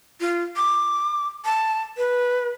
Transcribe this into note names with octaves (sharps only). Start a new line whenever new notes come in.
F4
D6
A5
B4